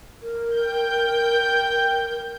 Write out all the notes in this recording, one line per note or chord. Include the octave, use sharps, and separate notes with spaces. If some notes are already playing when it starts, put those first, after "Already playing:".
A#4
G5 G6